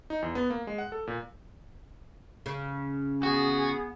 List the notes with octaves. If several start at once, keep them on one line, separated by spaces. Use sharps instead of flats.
D#4
E2
B3
A#3
G#3
F#5
A4
A#2
C#3
B3 F#4 G#4